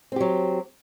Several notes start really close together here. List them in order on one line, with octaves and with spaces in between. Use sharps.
C4 G4 F#3